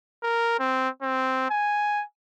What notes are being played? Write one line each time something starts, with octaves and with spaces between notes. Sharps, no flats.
A#4
C4
C4
G#5